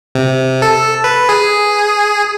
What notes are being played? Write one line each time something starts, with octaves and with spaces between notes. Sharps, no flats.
C3
A4
B4
G#4